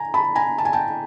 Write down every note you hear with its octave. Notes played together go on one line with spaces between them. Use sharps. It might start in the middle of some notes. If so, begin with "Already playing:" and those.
Already playing: G#5 A#5
A5 B5
G#5 A#5
A5
G#5
G5 A5